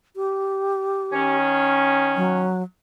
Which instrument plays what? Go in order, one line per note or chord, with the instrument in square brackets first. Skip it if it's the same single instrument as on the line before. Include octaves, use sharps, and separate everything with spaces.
[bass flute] G4
[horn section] D#3 C#4
[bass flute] F#3